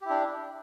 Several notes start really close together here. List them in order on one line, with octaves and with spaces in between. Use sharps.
G4 E4 D4